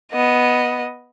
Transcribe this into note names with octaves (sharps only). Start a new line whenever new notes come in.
B3 D#5